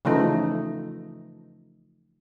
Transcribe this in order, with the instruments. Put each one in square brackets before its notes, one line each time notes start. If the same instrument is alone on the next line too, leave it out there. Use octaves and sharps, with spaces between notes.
[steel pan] C#3 E3 F3 A3 D#4